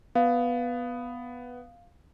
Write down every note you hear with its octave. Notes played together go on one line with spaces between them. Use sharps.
B3 F5